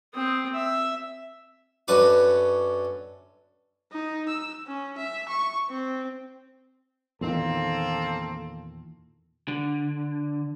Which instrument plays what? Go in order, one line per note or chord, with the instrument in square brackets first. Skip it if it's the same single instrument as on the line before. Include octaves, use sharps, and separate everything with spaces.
[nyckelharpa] C4 D#6
E5
[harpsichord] F#2 D3 F#4 B4 D6
[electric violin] D#4
E6
C#4
E5
C#6
C4
[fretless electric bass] E2 A#2 D#3 [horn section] A#3 C4 A4
[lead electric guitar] D3